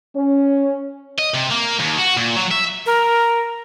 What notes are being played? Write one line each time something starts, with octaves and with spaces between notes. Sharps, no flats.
C#4
D#5
C3
A#3
D#2
F#4
A#2
F#3
E5
A#4